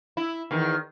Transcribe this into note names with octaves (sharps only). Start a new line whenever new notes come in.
E4
E2 D#3